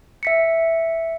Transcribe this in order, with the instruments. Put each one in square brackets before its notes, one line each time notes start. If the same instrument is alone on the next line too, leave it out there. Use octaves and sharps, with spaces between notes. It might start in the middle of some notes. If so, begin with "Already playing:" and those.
[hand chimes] E5 B6 C#7